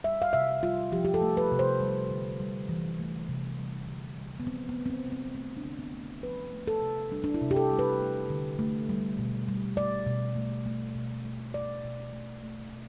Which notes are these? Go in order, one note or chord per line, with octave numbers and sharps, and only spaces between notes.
G3 E5
F5
C3 E5
G3 F4
F3 G4
G4
A4
A3
B4
C3
C5
G3
D3
G3
E3
A3
C3
G3
D3
G3
B3
F3 C4
B3
A3
C4
B3
C3
C4
B3
A3 C4
D4
D3
B3
A3
F3 B4
A3
A4
C3
G3 D4
D4
E4
C3
G4
A4
G3
B4
A3
D3
A3
G3
B2
G3
A3 D5
B2
A3
A3
B2
A3
A3 D5
B2
A3
A3
B2